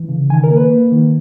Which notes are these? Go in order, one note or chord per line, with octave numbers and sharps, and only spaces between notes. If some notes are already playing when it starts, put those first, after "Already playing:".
Already playing: E3
C#3
D#3 G#5
A#4
A#3
B4
A#3
D#3